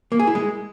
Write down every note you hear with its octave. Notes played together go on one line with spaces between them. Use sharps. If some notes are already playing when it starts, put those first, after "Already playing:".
A#3
G#4
E4
G#3